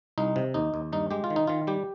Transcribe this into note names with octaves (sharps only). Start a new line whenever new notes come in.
C2 D#4
C3
D#2 D#4
D#2
G2 D#4
G#3 G4
F4
D#3
D#4
D#3 F4
G3 G4